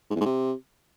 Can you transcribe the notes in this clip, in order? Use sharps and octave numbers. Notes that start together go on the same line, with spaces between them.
G#2
E2
G#2
C3